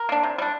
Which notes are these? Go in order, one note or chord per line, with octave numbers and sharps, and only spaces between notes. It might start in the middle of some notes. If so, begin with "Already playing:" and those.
Already playing: A#4
A#3 D4
C3
G3 D4